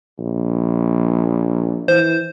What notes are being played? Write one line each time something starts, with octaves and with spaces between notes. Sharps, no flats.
A#1
E3 C5